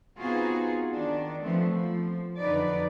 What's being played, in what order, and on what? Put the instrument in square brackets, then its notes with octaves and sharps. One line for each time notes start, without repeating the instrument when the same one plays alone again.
[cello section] B3 C4 D#4 F4 F#4 G#4
D#3 D4
F3 A3 B3 C4
F3
F2 D3 F#3 D#4 B4 D5